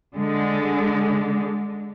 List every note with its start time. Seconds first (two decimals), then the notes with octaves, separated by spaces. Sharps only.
0.14 D3 G#3